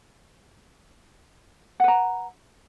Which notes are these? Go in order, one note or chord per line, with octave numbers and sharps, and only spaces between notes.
B4 F#5 A#5